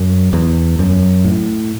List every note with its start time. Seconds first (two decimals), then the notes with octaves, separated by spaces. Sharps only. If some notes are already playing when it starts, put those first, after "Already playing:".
Already playing: F#2
0.33 E2
0.79 F#2
1.24 A2